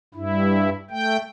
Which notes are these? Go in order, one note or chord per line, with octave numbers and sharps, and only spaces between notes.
G2 E4
A3 G5